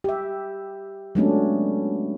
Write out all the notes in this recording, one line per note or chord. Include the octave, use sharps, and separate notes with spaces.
G4 E5
F#3 G#3 A3 B3 C#4 D4